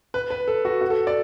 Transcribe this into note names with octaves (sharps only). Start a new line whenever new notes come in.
B4
B4
A4
F#4
F#4
A4
D5